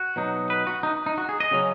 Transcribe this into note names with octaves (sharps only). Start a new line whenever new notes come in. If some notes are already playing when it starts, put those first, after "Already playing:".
Already playing: F#4
B2 F#3 D#4
B4
F#4
D#4
D#4
F#4
G#4
D#5
C#3 F#3 C#4